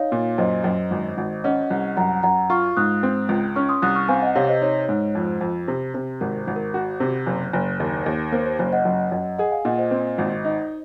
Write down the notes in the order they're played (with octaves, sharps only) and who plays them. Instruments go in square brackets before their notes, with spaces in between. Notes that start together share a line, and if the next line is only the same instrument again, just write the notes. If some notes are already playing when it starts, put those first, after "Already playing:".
Already playing: [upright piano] D#4 [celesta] C#5 F5
[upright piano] A#2
[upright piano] F#2 [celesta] C5 D#5
[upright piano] F#2
G#1
G#1
[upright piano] C#4 [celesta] D#5 F#5
[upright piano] C2
[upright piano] F#2 [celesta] F#5 A#5
[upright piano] F#2 [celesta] F#5 A#5
[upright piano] F4 [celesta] C#6 F6
[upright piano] G#2 [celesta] D#6 F#6
[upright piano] C4
C#2
[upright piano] C#4 [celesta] C#6 F6
[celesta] C6 D#6
[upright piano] C2 [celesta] D#6 F#6
[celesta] C#6 F6
[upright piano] C4 [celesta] F5 G#5
[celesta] D#5 F#5
[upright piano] C3 [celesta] C#5 F5
[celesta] C5 D#5
[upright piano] D#4 [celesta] C#5
[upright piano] G#2
[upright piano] F2 [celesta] C5
[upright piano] F2
C3
C3
[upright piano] G#1 [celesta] A#4
[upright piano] G#1
[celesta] A#4
[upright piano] F#4
C3
F#1
F#1
[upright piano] D#2 [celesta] A#4
[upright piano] D#2
[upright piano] A#3 [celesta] C5
[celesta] C5
[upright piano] F#1 [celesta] C5
[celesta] D#5 F#5
[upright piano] F#2
F#2
[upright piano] G#4 [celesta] D#5 F#5
[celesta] F5 G#5
[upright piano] A#2 [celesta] D#5 F#5
[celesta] C5 D#5
[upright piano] C4
G#1
D#4